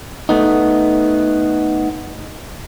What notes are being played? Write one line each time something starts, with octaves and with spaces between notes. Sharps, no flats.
A3 B3 D#4